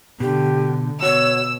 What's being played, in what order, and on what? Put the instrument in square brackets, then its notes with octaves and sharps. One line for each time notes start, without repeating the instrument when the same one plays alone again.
[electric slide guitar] B2 [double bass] D3 [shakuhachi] G4
[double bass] B2 [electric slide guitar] F#4 [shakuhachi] C#5 [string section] E6